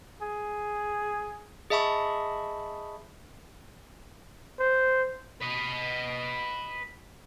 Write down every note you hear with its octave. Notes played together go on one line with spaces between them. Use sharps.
G#4
G#4 D#5 E5 A5 B5 C#6
C5
B4 D#5